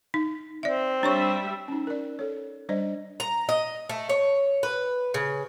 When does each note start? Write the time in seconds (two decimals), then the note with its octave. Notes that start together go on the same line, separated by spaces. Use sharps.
0.14 D#4
0.63 C4 D5 E5
1.03 G3 D4 C#5 E5 C#6
1.68 C#4 D#4
1.87 A#4 D5
2.19 A4 C#5
2.69 G3 D4 C5 D5 D#5
3.20 A#5
3.49 D#5
3.90 A3
4.09 C#5
4.63 B4
5.14 C#3